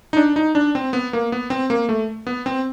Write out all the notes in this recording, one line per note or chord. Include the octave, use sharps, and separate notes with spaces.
D#4
D4
D#4
D4
C4
B3
A#3
B3
C4
A#3
A3
B3
C4